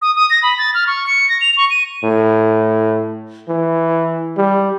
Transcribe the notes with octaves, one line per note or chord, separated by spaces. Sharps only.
D#6
D#6
A#6
B5
A6
F6
C#6
C#7
A#6
F7
C#6
D#7
A2
E3
G3